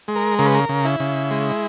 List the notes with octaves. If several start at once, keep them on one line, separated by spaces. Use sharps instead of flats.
G#3
A#4
C#3 A#4
B4
A#4
C#3
E4
C#3
G#3